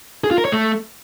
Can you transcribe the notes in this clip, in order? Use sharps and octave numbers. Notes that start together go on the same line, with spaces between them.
G#4
F4
A#4
C#5
A3